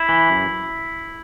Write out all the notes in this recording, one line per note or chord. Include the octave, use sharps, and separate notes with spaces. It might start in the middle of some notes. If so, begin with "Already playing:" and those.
Already playing: E4
E3
F#2